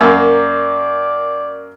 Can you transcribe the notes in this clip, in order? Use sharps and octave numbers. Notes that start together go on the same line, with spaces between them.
F#2 A#3 D5